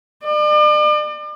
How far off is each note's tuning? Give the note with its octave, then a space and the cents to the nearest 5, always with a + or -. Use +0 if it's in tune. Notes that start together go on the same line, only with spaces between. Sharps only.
D5 +40